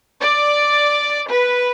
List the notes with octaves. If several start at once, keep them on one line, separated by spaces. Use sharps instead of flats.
D5
B4